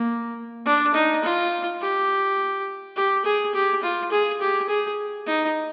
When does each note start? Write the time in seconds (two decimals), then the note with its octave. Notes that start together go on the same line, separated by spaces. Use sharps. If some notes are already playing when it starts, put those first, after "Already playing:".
Already playing: A#3
0.66 D4
0.94 D#4
1.24 F4
1.81 G4
2.96 G4
3.25 G#4
3.54 G4
3.83 F4
4.11 G#4
4.41 G4
4.68 G#4
5.26 D#4